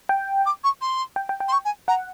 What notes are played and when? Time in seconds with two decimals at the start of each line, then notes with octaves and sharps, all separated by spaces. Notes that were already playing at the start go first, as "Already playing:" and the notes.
0.09 G5
0.46 D6
0.63 C#6
0.81 C6
1.16 G5
1.29 G5
1.40 G5
1.48 C6
1.52 C#6
1.65 G#5
1.88 F#5 A#5